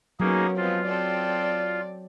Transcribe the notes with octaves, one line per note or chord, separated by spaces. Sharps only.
F#3 A#3 B3 C#4 D#4 G#4 A#4
F3 G#3 B3 C4 F4
C4 A4 D5 G5